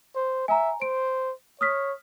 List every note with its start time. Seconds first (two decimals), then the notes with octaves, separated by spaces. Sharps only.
0.15 C5
0.48 E5 G#5 A#5
0.82 C5 D7
1.61 C#5 D#6 F6 B6